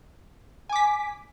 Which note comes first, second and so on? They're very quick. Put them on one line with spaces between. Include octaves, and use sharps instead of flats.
G#5 D6 B6